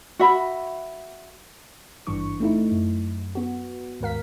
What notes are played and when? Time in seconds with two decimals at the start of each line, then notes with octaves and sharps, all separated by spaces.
0.19 F#4 E5 B5
2.07 G#1 G2 E3 D4 C#6
2.40 A3 C4 D#4 E4
2.72 F#2
3.35 B3 F#4
4.01 D#2 G#2 A#4 F5 B6